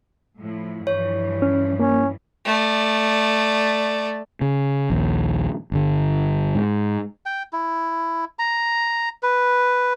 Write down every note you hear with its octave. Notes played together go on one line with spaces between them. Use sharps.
A2 F3 E4
G2 E3 F3 C#5
C#4
A#3 C#4
A3 D5
C#3
A#1 D#2
G1 D3
G#2
G5
E4
A#5
B4